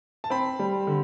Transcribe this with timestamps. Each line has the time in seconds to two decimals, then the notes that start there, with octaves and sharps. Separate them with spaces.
0.24 A5
0.30 C4 B5
0.59 G3
0.87 D3